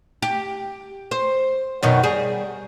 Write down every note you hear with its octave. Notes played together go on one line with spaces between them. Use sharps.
G4
C5
F#2 B2 D#3
G3 G#4